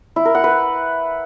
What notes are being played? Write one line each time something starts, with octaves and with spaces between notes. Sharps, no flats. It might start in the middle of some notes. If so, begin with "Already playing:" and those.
E4
A#4
F#5
B4